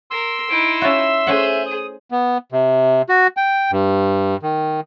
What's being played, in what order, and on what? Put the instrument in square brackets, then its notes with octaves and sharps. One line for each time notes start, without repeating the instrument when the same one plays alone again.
[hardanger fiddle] A#4 [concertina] C6 E6
[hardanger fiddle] D#4 E4 [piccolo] D7
[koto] C#4 F4 F#4 [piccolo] E5
[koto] A3 C#4 F#5 [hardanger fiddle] G#4 C5
[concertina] D#6
[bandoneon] B3
C3
F#4
G5
G2
D#3